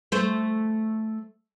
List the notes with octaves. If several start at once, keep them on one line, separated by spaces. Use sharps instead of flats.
A3 C5